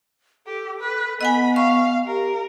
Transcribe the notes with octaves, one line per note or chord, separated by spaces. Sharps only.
G4 A4
B4
B3 D#5 F#5 G#5 B5
F5 C#6
G4 A#4